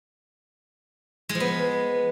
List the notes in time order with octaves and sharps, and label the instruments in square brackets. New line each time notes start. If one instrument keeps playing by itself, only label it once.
[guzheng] G#3
F3
B3